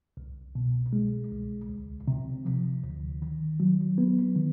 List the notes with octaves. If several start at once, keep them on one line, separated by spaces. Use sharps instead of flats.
C2
B2
G#3
C2
D2
C3
F3
D2
D#3
F#3
B3
D#3